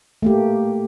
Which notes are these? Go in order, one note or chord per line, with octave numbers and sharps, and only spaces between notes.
A3 A#3 G4